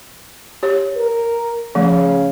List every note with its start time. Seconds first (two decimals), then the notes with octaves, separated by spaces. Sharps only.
0.63 G4 C#5
0.96 A#4
1.75 C#3 F3 A3